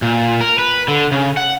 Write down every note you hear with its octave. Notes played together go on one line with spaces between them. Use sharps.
A#2
A#4
B4
D3
C#3
F#5